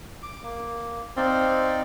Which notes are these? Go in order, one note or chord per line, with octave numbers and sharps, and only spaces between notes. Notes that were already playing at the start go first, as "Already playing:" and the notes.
D6
A#3
C4 D#4 D5 F5